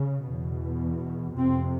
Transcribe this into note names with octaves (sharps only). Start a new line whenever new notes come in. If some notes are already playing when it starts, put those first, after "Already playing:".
Already playing: C#3
E2 B2
F2 C3 C4